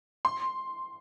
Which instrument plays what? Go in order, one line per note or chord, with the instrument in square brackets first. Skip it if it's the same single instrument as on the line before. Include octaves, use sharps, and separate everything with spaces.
[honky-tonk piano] C6